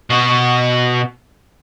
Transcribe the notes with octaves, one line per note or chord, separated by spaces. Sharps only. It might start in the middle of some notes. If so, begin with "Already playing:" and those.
B2 F#4